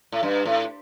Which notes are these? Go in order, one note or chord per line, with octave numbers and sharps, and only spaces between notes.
A2
G2
A2